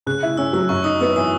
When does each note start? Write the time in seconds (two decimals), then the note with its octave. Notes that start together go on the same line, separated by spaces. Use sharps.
0.06 C#3 F#6
0.23 E4
0.37 C#4 E6
0.53 F#3 E6
0.69 F#2 C#6
0.84 D#4 D#6
1.00 B3 D#6
1.16 E3 D#6